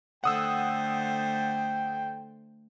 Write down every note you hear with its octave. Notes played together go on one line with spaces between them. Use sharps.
D3 A3 C5 F#5 G5 D#6 E6